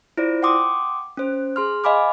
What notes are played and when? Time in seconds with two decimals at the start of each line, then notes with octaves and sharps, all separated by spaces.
0.17 E4 F4 C5 D5
0.43 F#5 G5 C6 D6 D#6
1.17 C#4 C5
1.56 G#4 C6 F6
1.84 D#5 F5 G#5 B5 D6 F6